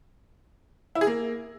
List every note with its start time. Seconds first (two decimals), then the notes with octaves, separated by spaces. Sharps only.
0.95 E4
1.01 G#4
1.07 A#3